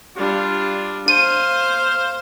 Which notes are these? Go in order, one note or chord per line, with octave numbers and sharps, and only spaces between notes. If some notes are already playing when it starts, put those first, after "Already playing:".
G3 D4 F4
C5 F5 D#7